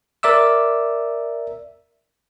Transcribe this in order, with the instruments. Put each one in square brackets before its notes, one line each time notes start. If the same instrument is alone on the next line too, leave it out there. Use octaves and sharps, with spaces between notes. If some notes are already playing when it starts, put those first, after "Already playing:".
[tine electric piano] A#4 D5 E5 D6 E6